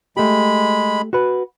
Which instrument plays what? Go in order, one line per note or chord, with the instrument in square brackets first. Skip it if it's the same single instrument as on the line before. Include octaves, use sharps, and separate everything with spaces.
[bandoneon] G#3 B5 [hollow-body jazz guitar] A3 G4
[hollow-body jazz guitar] F#4 B4